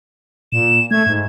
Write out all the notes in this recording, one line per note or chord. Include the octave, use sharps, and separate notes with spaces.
A#2 E7
A3 G#6
G#2